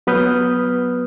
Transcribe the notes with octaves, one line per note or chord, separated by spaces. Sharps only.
F#3 B3 B4 D#6 F6 G6